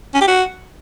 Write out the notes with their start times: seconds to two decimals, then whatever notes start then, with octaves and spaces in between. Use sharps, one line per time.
0.14 C#4
0.21 G4
0.28 F#4